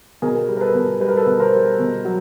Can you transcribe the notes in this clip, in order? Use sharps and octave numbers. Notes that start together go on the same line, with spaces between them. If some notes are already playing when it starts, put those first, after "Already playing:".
B2 G#4 A#4
G3
A#4
A4 B4
B2
G3 B4
A#4
A4 B4
B2
A#4 C5
G3
B2
F#3